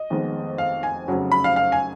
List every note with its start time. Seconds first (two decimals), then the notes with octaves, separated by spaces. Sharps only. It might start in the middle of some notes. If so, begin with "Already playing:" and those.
Already playing: D#5
0.10 F1 F2 D#3 G#3 B3
0.58 F5
0.83 G#5
1.08 F1 F2 C#3 F#3
1.32 B5
1.44 F5
1.56 F5
1.72 G#5